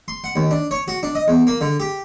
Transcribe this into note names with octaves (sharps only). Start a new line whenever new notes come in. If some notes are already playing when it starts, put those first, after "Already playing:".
C6
F#5
D#2
D4
C#5
F#4
D4
D#5
E2
A#3
D3
G4